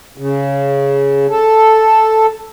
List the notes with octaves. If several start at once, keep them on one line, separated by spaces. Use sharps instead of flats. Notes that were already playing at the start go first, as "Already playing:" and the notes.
C#3
A4